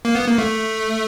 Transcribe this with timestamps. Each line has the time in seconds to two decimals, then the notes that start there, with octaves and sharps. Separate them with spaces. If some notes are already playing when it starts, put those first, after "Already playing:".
0.05 A#3
0.15 B3
0.27 A#3
0.38 A3